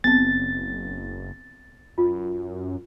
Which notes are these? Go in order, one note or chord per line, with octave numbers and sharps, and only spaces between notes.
F#1 B3 C4 A6
F#2 F4